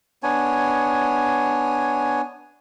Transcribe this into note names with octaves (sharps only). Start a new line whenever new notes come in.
B3 D4 C#5 G#5